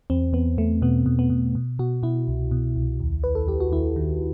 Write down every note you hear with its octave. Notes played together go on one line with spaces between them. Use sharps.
E2 C4
E2 B3
E2 A3
B2 B3
B2
B3
B2
B2
B2 F#4
B2 E4
C2
B2
C2
D#2
D#2 B4
A4
D#2 G4
F#4
D#2 E4
D#3